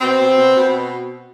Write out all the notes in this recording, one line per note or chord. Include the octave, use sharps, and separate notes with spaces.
B2 C4
B2
B2
B2